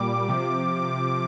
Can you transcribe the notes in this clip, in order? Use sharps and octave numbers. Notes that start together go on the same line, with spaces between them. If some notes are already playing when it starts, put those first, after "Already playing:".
Already playing: A#2 G3 D6
C3 F3